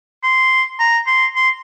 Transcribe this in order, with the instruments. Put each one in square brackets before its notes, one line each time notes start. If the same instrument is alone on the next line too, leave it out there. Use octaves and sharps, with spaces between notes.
[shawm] C6
A#5
C6
C6